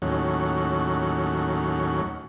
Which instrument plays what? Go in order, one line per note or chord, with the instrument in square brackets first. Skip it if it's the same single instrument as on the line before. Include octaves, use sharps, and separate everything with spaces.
[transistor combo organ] D#2 A2 F#3 C#4